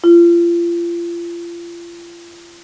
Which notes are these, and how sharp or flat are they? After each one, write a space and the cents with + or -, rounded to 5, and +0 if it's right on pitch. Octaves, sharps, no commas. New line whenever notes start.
F4 -35